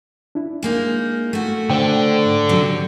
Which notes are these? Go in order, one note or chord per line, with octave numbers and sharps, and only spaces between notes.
D4 E4
G#3 A#3 D#4
A3 F#4
D3 C5 G5
G#2
C3 F#3